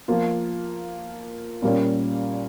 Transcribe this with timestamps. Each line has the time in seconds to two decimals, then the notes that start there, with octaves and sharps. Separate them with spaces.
0.08 F3 A#3 F4
1.62 A#2 G3 A#3 C#4